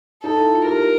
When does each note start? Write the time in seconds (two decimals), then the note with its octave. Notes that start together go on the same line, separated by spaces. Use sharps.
0.23 D#4 A4
0.38 E4
0.52 F4
0.65 G4 A#4